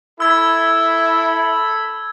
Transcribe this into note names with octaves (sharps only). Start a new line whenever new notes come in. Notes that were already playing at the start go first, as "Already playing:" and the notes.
E4 A4 B5 E6 G#6